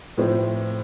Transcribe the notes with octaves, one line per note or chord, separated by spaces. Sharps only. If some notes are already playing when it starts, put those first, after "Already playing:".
A2 F3 C4